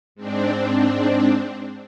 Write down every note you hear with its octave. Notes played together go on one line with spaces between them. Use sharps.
G#2 C4 D4